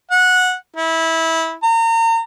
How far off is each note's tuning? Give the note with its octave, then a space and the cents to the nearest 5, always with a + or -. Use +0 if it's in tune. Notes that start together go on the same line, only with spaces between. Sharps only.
F#5 -15
E4 -20
A#5 -35